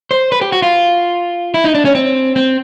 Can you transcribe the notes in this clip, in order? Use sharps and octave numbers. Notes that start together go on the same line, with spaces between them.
C5
B4
G4
F#4
F4
E4
D#4
D4
C#4
C4
C4